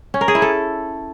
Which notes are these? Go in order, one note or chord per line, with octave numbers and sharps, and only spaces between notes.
C#4
A#4
G#4
E4
A4